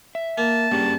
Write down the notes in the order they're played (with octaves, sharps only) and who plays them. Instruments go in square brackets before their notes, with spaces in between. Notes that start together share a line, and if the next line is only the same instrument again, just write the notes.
[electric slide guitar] E5
[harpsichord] A#3 [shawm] A5
[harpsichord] G2 [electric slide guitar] A#3 C#4 G#4